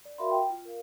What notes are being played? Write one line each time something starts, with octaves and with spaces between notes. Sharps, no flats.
D5
F#4 A#4 E5 F5 B5 C6
G5
F4
A#4 F5